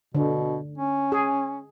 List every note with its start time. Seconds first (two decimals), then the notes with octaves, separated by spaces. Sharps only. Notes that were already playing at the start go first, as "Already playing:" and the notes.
0.15 B2 D3
0.78 C#4
1.12 G#4